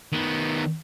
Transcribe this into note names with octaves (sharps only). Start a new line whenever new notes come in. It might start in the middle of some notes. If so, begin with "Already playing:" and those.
D#3 B3